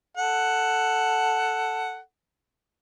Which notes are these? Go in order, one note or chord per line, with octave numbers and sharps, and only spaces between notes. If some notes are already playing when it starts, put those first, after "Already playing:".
A4 F#5